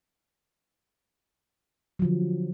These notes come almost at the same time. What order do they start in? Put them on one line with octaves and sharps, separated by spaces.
F#3 F3 D3